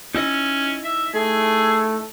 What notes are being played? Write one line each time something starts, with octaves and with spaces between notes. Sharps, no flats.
C#4 D#4 E4 D#5
E5
A3 G#4